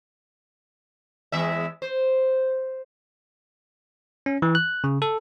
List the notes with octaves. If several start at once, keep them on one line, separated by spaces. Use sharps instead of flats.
E2 G#3 E5
C5
C#4
E3
F#6
C#3
A4